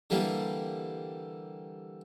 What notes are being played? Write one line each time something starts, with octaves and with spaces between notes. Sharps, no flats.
D3 E3 G3 A#3